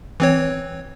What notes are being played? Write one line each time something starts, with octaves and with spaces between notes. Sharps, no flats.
E3 C4 C#5